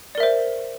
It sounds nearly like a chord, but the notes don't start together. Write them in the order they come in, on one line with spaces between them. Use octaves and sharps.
D5 A#4 E5 C5